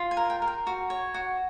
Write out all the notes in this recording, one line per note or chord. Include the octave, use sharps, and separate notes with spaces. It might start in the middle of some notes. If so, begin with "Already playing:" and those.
Already playing: F4
G#5
A#4
G5
A#4
G5
F#4
C#5
F#4